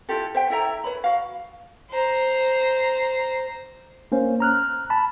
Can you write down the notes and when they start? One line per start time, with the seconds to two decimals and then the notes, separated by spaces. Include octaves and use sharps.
0.09 E4 F4 G4 A4
0.35 C5 E5 G5
0.50 E4 A4 E5 A#5
0.84 B4 C#5 B5
1.04 F#4 F5
1.91 C5 A#5
4.12 A#3 C#4 C5
4.40 A#5 F6 F#6
4.90 A5 B5